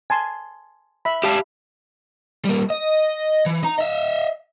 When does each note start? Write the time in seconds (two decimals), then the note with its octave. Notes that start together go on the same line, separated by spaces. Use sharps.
0.10 G#5 A5 C6
1.05 E5 B5
1.23 G4 F5 A5
2.45 G3 A#3
2.70 D#5
3.46 E3
3.63 D#4 A#5
3.78 D#5 E5